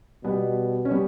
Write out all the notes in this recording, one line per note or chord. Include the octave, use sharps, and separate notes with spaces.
B2 G3 B3
C#4
G3 B3